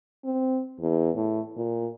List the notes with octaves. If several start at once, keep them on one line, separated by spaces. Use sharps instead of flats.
C4
E2
A2
A#2